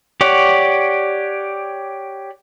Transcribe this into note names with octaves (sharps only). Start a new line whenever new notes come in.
G4 C#5 D5 F#5